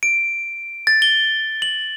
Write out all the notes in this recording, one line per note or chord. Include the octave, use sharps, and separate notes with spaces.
D7
A6
G7
F#7